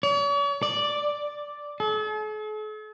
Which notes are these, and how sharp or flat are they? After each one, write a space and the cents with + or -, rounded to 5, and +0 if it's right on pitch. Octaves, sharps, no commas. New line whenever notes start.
C#5 +45
D5 +0
A4 -45